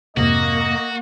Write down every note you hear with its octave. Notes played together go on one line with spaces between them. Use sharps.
F2 G#2 C3 A#3 F#4 D#5